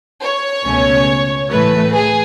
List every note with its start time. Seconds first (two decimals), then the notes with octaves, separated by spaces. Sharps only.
0.22 C#5
0.65 C#2 B2 A3 C#4
1.50 A2 E3 A3 B4
1.93 G#4